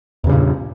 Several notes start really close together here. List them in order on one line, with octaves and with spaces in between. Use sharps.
E2 C#3 G2 A#2